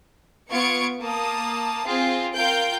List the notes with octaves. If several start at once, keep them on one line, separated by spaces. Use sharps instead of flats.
B3 F4 C#6 G#6 C#7 D7
A#3 A5 D#6
C4 F4 G#4
F4 A#4 F5 G5 G6 D7